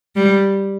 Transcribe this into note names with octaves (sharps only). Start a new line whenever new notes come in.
G3